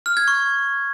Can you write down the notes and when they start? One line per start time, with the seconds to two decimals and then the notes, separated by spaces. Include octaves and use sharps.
0.06 F6
0.17 G#6
0.28 C#6